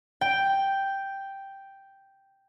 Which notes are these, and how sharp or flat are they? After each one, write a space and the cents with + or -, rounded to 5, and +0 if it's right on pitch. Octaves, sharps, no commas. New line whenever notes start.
G5 +0